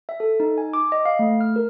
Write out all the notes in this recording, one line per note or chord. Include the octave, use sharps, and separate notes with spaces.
E5
A4
D#4
G#5
D6
D#5
F5
A3
F6
A#4